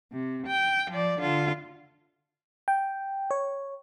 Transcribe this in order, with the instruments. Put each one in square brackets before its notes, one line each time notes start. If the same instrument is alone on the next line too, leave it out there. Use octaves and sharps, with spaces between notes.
[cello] C3
G5
F3 D5
D3 F4
[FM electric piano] G5
C#5